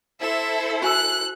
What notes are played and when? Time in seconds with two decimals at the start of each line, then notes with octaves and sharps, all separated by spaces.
0.21 E4 A4 C5 E5
0.82 F#4 G#5 E6 F#6